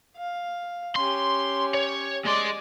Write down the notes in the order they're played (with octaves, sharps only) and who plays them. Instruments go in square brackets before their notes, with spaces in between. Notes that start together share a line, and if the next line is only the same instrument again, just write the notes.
[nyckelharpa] F5
[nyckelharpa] C#4 G4 [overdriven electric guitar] C6
[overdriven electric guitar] C#5
[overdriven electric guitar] G#3 C6 [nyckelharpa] D5 D#5